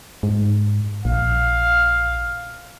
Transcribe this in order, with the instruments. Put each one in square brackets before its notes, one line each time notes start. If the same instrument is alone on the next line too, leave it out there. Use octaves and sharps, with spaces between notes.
[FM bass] G#2
[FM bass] A#1 [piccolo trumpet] F5